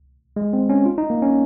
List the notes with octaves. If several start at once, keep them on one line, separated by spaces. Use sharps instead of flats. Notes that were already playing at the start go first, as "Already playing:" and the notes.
G#3
C4
C#4
F4
D#4
A#3
C#4